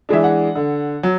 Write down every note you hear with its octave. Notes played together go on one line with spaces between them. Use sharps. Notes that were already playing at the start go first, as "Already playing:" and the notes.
E3 G#3 D4 E5
F#5
D3
F#3